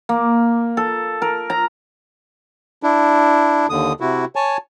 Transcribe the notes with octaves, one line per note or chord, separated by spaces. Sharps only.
A#3
A4
A#4
A#5
D4 E4
D#2 D3 D#6
C3 E4 F#4
C#5 G#5 A5